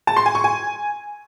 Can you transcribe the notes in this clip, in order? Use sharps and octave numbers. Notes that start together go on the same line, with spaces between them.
A5
C6
G#5
C#6
G#5